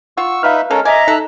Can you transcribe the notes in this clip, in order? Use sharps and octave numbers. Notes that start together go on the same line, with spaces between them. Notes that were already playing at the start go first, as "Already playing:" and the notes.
F4 F#5 C#6 E6
D#4 B4 E5 F5 F6
G#3 C#4 A4 A#4
D#5 E5 G#5 A#5 D6
D#4 A4 E6 F#6